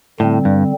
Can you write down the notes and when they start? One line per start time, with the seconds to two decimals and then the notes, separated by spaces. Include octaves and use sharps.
0.19 A2 D3 G3 C4
0.45 G2